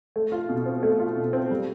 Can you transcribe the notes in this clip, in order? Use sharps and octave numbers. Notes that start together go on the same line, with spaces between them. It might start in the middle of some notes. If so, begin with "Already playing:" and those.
A3
F4
B2
C4
A3
F4
B2
C4
G3